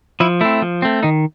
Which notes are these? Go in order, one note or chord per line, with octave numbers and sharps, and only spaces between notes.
F3 E4
A3 C4 E4
F3
A3 C4
D#3 D#4